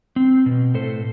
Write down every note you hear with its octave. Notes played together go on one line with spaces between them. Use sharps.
C4
B2
A2 A4 C5